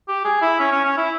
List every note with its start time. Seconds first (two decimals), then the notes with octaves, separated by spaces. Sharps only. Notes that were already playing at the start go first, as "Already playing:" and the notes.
0.08 G4
0.25 G#4
0.42 E4
0.59 C#4
0.72 C#4
0.84 C#4
0.97 E4